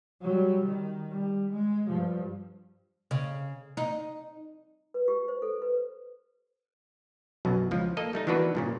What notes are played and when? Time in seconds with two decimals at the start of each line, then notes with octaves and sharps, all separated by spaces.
0.22 F#3 G3
0.66 D#3
1.12 G3
1.52 G#3
1.87 G2 F3
3.11 C#3
3.77 D#4
4.94 B4
5.08 G4
5.28 C5
5.42 A4
5.62 B4
7.45 B1 F#2 B2
7.71 C#2 F3
7.97 A#3 A4 D#5
8.13 G3 A3 D#4
8.27 D#3 E3 B3 D4 F#4 B4
8.55 G2 A#2 C#3